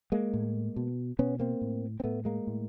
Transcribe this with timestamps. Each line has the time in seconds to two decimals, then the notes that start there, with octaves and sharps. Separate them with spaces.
0.12 G#3 A#3
0.34 A2
0.76 B2
1.19 B2 B3 C#4
1.39 A#3 C4
1.61 A2
2.00 C4
2.04 A2 A3 B3
2.25 G#3 A#3
2.47 A2